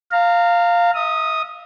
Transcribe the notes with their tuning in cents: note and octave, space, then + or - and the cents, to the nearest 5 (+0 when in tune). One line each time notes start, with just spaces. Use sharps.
F5 +0 A#5 -30
E5 -35 D#6 +0